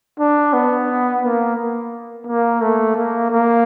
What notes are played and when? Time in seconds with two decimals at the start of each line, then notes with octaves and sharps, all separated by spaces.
0.19 D4
0.53 B3
1.23 A#3
2.27 A#3
2.61 A3
2.96 A#3
3.31 A#3